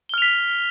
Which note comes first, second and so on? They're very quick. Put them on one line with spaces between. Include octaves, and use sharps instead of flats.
G7 F6 F7 B6